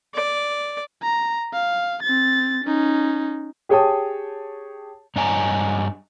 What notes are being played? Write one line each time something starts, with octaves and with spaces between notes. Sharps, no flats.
D5
A#5
F5
C4 A6
C#4 D#4
G4 G#4 C#5 G5 A5 D#6
G2 D4 C#5 D#5 G#5 A#5